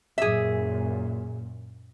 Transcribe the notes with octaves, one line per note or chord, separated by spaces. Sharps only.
F#2 A#2 G#4 E5